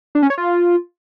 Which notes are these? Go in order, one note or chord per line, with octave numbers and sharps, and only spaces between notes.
D4
C#4
C#5
F4